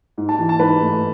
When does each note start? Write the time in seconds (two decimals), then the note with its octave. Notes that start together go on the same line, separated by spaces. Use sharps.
0.18 G#2
0.29 A5
0.39 E3
0.49 A5
0.59 G#2 B4
0.81 A3